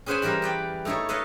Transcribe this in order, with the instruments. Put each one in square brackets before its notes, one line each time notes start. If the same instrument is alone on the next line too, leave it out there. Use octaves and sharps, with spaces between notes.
[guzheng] C#4 G#4 B4 C5 F#5 G#5
E3 G3 G4 A#4 C5
B4 D5 G5
A3 D#4 E4 A4 C#5
A4 B4 C#5 D#5 F5